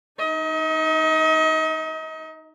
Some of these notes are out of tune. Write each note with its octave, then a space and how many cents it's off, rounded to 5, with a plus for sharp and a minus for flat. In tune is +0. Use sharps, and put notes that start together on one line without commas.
D#4 +0 D#5 +35